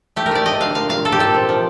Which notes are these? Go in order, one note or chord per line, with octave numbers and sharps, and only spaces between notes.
A3 G4
A#4
A3 D5
A3 D#5
D3 F5
A#2 F5
A#2 F5
A#2 A4
G4
A#2 A4
C3
F3